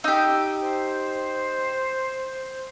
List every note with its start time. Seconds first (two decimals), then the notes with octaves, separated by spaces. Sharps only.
0.04 D#4 G4 E6
0.62 C5